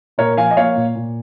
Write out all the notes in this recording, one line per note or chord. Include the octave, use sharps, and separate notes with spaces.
A#2 A#4 C#5
F3 F5 G#5
D#5
A#3 C#5 F5
A#2
A#2